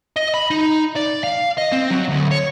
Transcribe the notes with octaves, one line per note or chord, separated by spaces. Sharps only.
D#5
B5
D#4
D5
F5
D#5
C4
F#3
D2
C#5